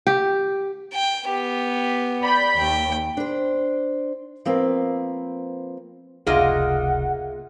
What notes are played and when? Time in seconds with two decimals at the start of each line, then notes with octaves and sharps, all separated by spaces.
0.07 G4
0.93 G5
1.27 B3 G4
2.22 D5 B5 G6
2.59 D#2 G5
3.17 D4 C5
4.45 F3 A#3 C4 B4
6.27 F1 C#2 A#3 F4 G#4 D#5 E5 F#5